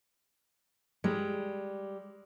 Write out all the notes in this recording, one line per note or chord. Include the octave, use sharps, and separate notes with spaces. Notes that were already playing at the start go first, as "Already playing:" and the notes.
G3 G#3